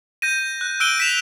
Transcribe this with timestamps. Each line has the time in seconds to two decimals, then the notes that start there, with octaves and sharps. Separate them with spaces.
0.22 G6 A#6 D#7
0.61 F#6
0.80 E6 F#6 D7 D#7 G7
1.00 B6 E7 F7